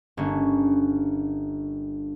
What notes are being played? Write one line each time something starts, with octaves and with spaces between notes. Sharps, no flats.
G1 A#3 C#4